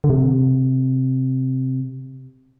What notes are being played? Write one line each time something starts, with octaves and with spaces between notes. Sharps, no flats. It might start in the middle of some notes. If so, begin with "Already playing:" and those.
D3
C3